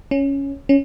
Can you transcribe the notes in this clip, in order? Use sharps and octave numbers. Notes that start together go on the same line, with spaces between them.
C#4
C#4